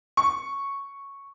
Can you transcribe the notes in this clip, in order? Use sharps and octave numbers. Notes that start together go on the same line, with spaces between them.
C#6